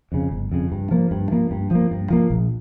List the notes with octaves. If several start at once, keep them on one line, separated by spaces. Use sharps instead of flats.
F2 C#3
G1
F2 C#3
G2
F3 A#3
G2
F3 A#3
G2
F3 A#3
G2
F3 A#3
A#1